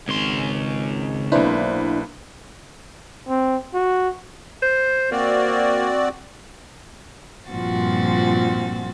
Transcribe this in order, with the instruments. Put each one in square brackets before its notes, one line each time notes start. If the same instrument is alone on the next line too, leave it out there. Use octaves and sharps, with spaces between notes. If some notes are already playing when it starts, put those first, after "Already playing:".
[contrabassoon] G#1 [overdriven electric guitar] C#2 C6
[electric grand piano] B1 A#3 B4 [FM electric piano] D4 E4 C5
[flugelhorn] C4
F#4
[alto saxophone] C5
[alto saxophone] A#3 [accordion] C4 F#4 D5
[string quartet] G2 A#2 F3 C4 F#4 A6